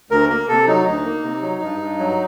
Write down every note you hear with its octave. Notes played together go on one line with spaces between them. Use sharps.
D2 A#4
A#3 A#4
C3 A4
F#3 D#4
D2 D#4
A#3
C3
F#3
G2
G2
F#3